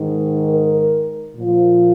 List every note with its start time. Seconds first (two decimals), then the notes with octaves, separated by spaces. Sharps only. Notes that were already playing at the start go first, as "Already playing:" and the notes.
Already playing: G#2 D#3
0.48 A#4
1.36 A#2 F3